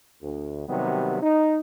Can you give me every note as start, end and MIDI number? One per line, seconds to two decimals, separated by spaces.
0.22 0.65 38
0.69 1.22 48
0.69 1.22 51
0.69 1.22 54
0.69 1.22 55
0.69 1.22 59
1.22 1.59 63